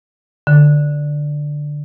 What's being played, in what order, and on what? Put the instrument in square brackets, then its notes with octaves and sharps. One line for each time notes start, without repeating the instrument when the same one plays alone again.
[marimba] D3